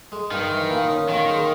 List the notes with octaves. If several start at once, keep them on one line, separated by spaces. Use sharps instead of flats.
G#3
G2 D#3
E3
A#2
C#4
A#2 D#3
G#3